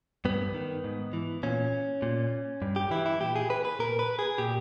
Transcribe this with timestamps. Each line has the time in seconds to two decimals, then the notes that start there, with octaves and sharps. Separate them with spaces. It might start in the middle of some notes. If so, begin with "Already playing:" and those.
0.25 G2 B3
0.54 D#3
0.84 G#2
1.13 E3
1.43 A#2 C#4
2.02 A#2
2.62 G2
2.76 G4
2.91 E3 E4
3.06 E4
3.20 A#2 G4
3.36 G#4
3.50 B4
3.65 B4
3.79 A#2 A#4
3.99 B4
4.19 G#4
4.38 A#2 G4